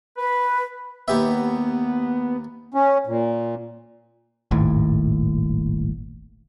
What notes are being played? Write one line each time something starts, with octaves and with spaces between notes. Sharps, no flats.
B4
D#2 B3 G4 E5
C#4
A#2
D#1 G#1 D#2 A2